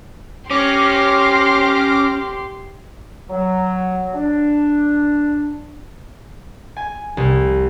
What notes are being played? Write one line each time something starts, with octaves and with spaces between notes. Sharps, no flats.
C#4 G4 C6 D6 F6 A#6
F#3
D4
G#5
C2